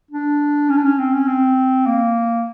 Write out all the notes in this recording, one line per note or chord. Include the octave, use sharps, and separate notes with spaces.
D4
C#4
D4
C#4
C4
C#4
C4
A#3